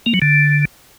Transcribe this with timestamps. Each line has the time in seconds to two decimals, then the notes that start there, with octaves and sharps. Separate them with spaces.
0.06 A#3
0.14 F#3
0.22 D3